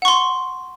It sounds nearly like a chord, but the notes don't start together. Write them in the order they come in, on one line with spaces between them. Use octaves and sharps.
F#5 C#6 C6